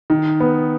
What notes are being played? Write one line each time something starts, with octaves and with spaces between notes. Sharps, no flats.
D#3
B3